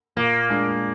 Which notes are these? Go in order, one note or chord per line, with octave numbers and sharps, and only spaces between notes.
A#2 A#3
G#3 D4 G#4